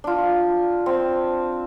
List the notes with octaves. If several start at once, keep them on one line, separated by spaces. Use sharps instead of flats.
D4 F4
C4